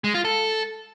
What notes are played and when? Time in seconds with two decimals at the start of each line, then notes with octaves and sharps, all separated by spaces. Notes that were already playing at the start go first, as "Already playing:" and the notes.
0.04 G#3
0.14 F4
0.25 A4